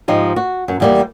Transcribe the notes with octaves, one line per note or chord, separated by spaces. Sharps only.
G#2 F3 D#4 G4
F#4
F#2
E2 G3 A#3